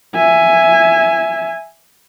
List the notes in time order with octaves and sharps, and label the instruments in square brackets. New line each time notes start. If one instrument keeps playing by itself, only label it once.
[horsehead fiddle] E5 G#5